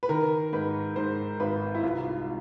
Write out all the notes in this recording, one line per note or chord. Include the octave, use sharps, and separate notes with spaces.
B4
D#3 A#4
G#2 B4
G#2 C5
G#1 B4
E4
C2 F4